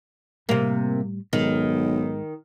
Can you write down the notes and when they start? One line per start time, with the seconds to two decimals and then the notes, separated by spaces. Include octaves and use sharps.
0.49 A2 C3 G3 A#3
1.33 B1 G#2 D#3 G#3